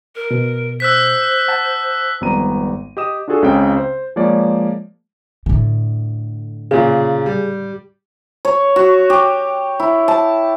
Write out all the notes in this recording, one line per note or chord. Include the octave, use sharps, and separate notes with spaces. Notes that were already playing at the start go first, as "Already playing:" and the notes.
A#4
B2
C5 E6 F#6 B6
F#5 A5
G#1 F2 G3 B3 A#5 D#7
G4 D#5 D#6 E7
D4 F4 F#4 G#4 A4
C#2 C#3 C4 G5
C5
F3 G#3 A#3 C#5 D5
A2 D3
A#2 C#3 G#4
G3
C#5
F#4
G4
E4
A5